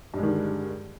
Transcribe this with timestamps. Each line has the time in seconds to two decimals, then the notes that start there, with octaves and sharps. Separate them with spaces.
0.14 G2
0.18 G#3
0.23 D#3
0.28 D3